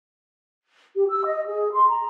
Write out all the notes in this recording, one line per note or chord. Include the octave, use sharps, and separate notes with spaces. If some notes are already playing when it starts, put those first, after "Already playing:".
G4
E6
D#5
G#4
C6
A#5